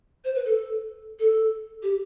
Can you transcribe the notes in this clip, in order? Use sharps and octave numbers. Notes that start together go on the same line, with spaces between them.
C5
B4
A4
A4
G4